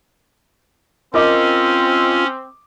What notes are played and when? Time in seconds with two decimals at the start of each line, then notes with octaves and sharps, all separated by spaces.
1.14 C4 C#4 F4 A#4 D#5 D6